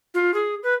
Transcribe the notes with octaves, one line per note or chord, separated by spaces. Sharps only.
F4
G#4
B4